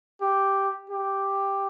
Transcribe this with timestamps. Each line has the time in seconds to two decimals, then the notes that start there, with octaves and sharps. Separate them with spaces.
0.21 G4
0.90 G4